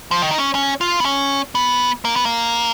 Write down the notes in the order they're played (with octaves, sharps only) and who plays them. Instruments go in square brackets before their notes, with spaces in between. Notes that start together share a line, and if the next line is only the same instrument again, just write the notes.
[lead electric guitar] F3
D#3
D#4
C#4
C#4
F4
B3
C#4
B3
A#3
B3
A#3